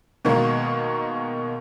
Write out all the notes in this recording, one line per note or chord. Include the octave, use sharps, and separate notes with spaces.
B2 D#3 G#3 A#3